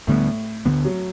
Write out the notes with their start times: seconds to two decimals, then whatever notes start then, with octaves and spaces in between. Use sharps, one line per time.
0.07 D2 A2 D3 G3 B3
0.65 D2 D3 G3 B3
0.85 F#3